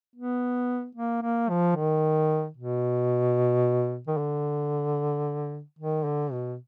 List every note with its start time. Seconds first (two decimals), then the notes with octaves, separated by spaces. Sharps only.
0.15 B3
0.95 A#3
1.23 A#3
1.50 F3
1.76 D#3
2.57 B2
4.07 D#3
4.17 D3
5.79 D#3
6.05 D3
6.32 B2